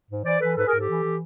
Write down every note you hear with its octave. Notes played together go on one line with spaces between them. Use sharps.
G#2
E3 C5 D5
E3 A4 B4
G#2 A4 B4
G#4 A#4
G#2
G4 A4
E3
E3